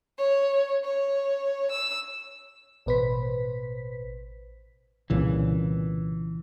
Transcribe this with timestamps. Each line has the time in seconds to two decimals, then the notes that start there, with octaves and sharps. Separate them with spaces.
0.18 C#5
0.84 C#5
1.71 E6
2.86 A1 B2 B4 C5 B6
5.10 C2 A#2 C#3 E3